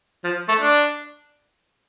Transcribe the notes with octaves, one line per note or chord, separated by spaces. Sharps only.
F3
A3
D4